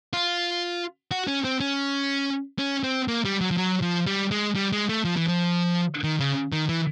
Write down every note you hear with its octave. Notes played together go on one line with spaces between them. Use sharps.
F4
F#4
C#4
C4
C#4
C#4
C4
A#3
G3
F#3
F3
F#3
F3
G3
G#3
G3
G#3
A3
F3
E3
F3
D#3
C#3
D#3
E3